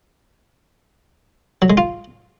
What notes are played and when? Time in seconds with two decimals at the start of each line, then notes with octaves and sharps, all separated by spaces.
1.62 F#3
1.70 G#3
1.77 F4